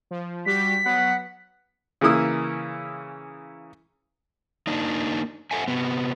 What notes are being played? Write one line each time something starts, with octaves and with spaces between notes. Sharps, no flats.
F3
G3 F#4 G4 B6
F#3 B3 F#5
C#3 E3 A#3 E4 D#6 E6
A#3 D4 D#4
A4 E5 F#5 G#5
C3 B3